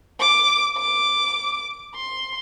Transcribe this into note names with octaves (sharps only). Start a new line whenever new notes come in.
D6
D6
C6